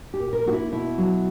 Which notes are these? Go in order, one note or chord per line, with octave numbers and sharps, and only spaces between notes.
G4
A#2
A#4
A#3 F#4
E4
B2 E4
F#3